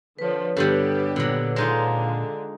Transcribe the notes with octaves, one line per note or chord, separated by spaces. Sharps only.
D3 F3 B4 C#5
G2 D3 G3 B3 G4 A4
A#2 D3 F#3
D3 G#3 D#4 F4